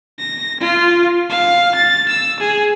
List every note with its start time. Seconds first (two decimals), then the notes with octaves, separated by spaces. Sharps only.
0.19 A#6
0.60 F4
1.30 F5
1.75 A6
2.09 E6
2.40 G#4